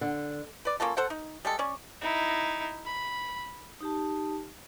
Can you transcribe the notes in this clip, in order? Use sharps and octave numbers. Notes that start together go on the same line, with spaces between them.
D3
B4 D5
A#3 C#4 F4 A4
A4 C5 F#5
D#4
G3 G#3 A4
C#4 D5 C#6
D#4 E4
B5
D#4 G4 A5